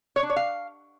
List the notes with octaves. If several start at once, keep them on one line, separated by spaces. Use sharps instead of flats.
C#5
D4
C#5
F5